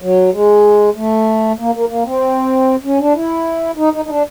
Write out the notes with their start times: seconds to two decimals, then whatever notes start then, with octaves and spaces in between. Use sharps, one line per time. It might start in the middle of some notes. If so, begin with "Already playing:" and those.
0.02 F#3
0.33 G#3
0.96 A3
1.59 A#3
1.75 A#3
1.89 A#3
2.05 C4
2.84 C#4
2.99 D4
3.15 E4
3.77 D#4
3.93 D#4
4.05 D#4
4.09 D4